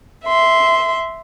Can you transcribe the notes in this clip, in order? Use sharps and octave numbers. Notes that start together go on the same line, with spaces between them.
E5 C6